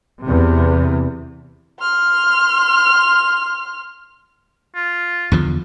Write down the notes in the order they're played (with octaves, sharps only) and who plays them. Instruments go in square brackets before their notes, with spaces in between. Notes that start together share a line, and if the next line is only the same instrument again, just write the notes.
[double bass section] E2 C3
[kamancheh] C6 F6
[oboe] F4
[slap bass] E2 D3 F3